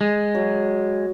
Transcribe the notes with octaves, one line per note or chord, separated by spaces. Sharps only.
G#3
F#3